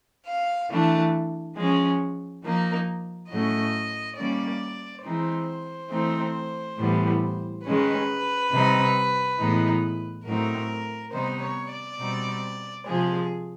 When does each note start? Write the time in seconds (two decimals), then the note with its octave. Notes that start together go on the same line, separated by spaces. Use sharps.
0.26 F5
0.69 E3 A3 D4
1.56 F3 G#3 C#4
2.43 F3 A#3 D#4
3.29 A2 F#3 A3 C#4 D#5
4.16 D#3 G3 A#3 C#4 D5
5.03 E3 G#3 C4 D#4 C5
5.90 E3 A3 C4 D#4
6.77 A2 E3 G3 B3
7.64 D#3 G#3 C#4 B4
8.51 C3 D#3 G3 C4 D#4
9.38 A2 E3 G#3 B3 D#4
10.25 A2 F#3 A3 C4 D#4 A#4
11.12 C3 D#3 G3 B3 D#4 C5
11.41 C#5
11.70 D5
11.99 B2 G3 C4 D#4
12.85 C3 F3 G#3 G#4